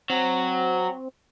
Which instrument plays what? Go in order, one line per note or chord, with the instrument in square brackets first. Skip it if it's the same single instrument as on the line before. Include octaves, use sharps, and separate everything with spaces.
[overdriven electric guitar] F#3 [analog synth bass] C4